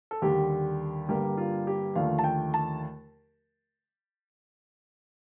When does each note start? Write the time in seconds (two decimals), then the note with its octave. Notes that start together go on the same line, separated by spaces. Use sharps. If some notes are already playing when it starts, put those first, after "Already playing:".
0.11 A4
0.22 D#2 D3 G3 G4
1.09 G2 D3 G3 A#3 G4
1.38 F4
1.67 G4
1.96 D#2 D3 F3 A3 F5
2.19 A5
2.24 G5
2.54 A5